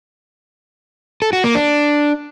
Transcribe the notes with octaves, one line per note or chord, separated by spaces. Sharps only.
A4
F#4
A#3
D4